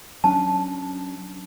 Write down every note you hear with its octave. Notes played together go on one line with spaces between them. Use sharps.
F#3 C#4 D4 A5